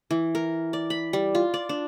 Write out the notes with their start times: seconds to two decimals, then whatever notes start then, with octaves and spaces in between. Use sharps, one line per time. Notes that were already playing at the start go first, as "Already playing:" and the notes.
0.11 E3
0.35 A#4
0.73 D5
0.90 B5
1.13 G3
1.35 F4
1.54 D5
1.69 D4